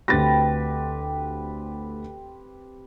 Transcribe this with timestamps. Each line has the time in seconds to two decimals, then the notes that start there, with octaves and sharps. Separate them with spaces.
0.08 D2 C4 G4 B4 A6 A#6